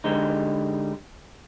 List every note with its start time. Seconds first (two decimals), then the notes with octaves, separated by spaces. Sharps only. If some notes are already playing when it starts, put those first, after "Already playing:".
0.04 D3 G3 G#3 D#4